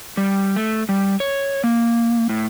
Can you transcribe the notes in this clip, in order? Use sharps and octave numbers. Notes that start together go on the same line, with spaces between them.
G3
A3
G3
C#5
A#3
A2